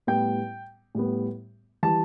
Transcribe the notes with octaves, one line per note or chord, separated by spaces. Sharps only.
A2 G3 B3 G5
A2 G3 B3
E3 G3 A5